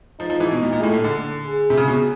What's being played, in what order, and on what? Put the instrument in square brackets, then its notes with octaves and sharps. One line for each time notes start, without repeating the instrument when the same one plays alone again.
[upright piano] F3 [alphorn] D#4
[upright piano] F3
E3
B2
A#2
A#2
[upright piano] A2 [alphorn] A4
[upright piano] A#2
D3
[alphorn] G#4
[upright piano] C3
C#3
B2